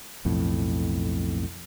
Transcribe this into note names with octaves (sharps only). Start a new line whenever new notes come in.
B1 F2 A2